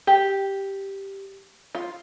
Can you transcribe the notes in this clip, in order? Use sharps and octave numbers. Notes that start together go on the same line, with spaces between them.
G4
F4